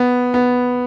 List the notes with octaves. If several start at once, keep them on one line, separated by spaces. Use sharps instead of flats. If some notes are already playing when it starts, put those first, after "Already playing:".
Already playing: B3
B3